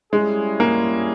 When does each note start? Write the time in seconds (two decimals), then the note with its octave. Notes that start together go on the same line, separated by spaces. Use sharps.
0.13 G3 G#3 C#4 E4 G#4
0.60 A#3